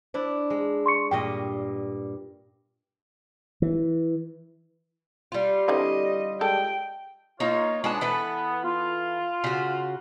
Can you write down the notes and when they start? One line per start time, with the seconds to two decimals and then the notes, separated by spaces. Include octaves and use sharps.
0.14 D4 E4 C5
0.50 G#3
0.86 C6 C#6 C#7
1.11 G2 A#2 D#5 G5
3.62 E3
5.32 G3 F4
5.68 D3 E3 C4 D#5
6.41 G#3 A4 G5
7.40 A#3 D#4 F4 C#5
7.84 G#3 B3 D4 A5
8.01 E3 A4 B4
8.64 F4
9.44 C#3 F#4